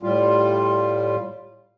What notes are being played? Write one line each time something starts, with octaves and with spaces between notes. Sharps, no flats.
A2 G3 F4